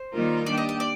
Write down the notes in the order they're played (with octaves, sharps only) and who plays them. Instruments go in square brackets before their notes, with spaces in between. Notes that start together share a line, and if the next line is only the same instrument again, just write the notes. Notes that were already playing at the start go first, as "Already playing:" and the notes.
Already playing: [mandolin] C5
[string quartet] D#3 G3 A#3 F4 A#4
[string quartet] A#3 D4 G4 [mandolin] D5
[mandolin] D#5
D#5
D5